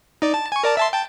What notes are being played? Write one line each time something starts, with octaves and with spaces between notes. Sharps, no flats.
D#4 D5
A5
G#5 C#6
A#4 D5 A5
E5 A5 C6
G5 A5